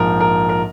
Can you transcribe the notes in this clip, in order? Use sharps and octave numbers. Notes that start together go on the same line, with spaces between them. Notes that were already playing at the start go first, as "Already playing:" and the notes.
Already playing: A#1 G#2 F3 A#4
A#4
A#4